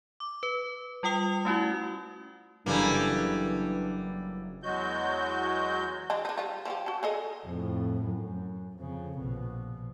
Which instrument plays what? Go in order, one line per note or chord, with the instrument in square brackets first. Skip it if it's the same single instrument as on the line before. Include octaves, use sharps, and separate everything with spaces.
[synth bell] D6
B4
G3 F4 G5 D#6 F7
A3 C#4 E4 F#4
[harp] F#1 A4 A5 [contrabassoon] G2 [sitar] E3 G3 A#3
[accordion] E2 F#3 G#3 F#4 G6
[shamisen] G#3 D4
D4 D#4
G3 F4
F3 E4 G4
F#4 A5
G#4 A4 D#5
[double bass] F2 A2
F#2
F2 C#3
A#1 B2